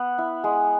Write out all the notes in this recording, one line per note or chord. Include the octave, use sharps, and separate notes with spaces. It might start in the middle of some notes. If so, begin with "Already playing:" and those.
Already playing: B3 F#5
E4
G#3